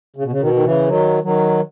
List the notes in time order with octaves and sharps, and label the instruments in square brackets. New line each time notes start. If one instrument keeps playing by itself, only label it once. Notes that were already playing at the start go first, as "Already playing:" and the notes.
[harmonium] C#3
B2
C#3
B2 D#3
D#3
C#3 E3
D#3 F#3
D#3 F#3